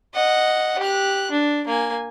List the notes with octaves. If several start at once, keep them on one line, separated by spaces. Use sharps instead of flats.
D#5 F#5
G4 F#6
D4
A#3 G#5